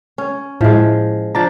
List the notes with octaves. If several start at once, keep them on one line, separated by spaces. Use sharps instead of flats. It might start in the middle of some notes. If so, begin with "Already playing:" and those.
C#4
A2 F3 G#3 E4
F3 D4 A#5 A6